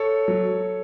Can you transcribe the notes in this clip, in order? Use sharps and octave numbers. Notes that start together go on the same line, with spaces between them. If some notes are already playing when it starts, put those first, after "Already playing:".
Already playing: A4 C#5
F#3